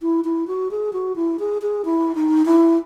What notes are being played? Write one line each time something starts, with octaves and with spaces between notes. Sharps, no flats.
E4
E4
F#4
G#4
F#4
E4
G#4
G#4
E4
D#4
E4